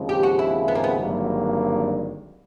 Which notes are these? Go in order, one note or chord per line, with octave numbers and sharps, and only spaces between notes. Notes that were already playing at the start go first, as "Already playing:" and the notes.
Already playing: D#2 C#3 F3 G#3 C4
G4
F#4
E4
B3
A#3
B3
G#1 G2 D3 F#3 A#3